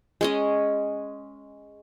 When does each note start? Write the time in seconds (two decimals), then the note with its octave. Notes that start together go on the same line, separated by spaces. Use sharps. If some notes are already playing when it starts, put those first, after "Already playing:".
0.21 G#3 C#4 D#5